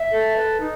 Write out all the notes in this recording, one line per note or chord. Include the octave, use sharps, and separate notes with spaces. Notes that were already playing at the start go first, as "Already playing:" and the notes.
Already playing: E5
A4
B4
D#4